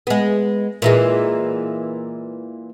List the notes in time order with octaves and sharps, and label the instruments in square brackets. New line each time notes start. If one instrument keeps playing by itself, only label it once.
[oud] G#3 B3
A#2 E3 G#3